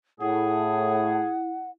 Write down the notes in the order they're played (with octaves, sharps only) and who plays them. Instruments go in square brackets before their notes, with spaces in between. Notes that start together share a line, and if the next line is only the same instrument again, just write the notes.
[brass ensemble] A2 [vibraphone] E4 [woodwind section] G#4 [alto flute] F#5